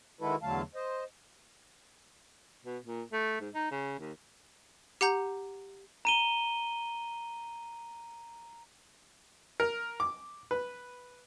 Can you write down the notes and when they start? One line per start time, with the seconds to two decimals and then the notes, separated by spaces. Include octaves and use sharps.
0.21 D#3 G#3 E4 F#4 A4 B4
0.43 E2 D3 F#3 A3 F5 A5
0.75 C5 D#5
2.65 B2
2.86 A#2
3.13 A3
3.41 G#2
3.54 D#4
3.71 C#3
3.99 D#2
5.01 G4 F#5 A#5 G6
6.05 A#5 D#7 G7
9.60 A#4
10.00 D6
10.51 B4